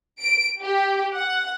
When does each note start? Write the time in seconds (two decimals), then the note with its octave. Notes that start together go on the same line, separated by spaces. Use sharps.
0.21 D7
0.62 G4
1.14 F#5